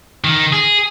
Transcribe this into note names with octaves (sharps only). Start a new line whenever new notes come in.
D#3
G#4